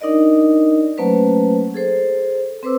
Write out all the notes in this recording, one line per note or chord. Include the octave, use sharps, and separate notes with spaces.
D4 D#4 A#4 D5 D#5
F#3 A3 A#3 C#4 B4 C5
G#4 A4 C5
C4 B4 C5 D6 E6